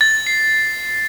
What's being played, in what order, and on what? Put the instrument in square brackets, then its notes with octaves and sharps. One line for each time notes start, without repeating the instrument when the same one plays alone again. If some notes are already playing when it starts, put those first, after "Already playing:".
[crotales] A6
C7